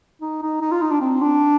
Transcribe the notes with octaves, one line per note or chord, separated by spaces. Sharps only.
D#4
D#4
D#4
F4
D#4
D4
C4
D4